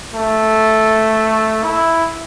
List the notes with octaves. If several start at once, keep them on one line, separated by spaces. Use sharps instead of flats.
A3
E4